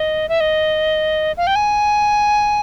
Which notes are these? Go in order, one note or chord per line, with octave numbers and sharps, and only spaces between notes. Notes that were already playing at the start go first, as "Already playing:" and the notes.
Already playing: D#5
E5
D#5
F5
G5
G#5